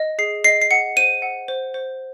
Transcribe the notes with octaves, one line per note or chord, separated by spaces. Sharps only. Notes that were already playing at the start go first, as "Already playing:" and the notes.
Already playing: D#5
G#4 C7
D#5 C7
C7
F#5 C#7
C5 D#7
F#5
C5
C5